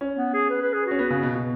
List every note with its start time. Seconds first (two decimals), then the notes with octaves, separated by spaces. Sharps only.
0.01 C#4
0.17 B3
0.34 G#4
0.50 B4
0.61 B4
0.73 G#4
0.86 C#4 F#4
0.99 B3
1.10 C#3
1.23 B2
1.35 B2